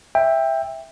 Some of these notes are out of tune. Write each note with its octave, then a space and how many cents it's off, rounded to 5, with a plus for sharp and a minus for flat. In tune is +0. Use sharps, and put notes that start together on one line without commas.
E5 +0 G5 +20